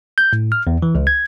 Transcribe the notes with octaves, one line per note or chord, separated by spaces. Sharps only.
G6
A2
F6
E2
E3
C#2
G#6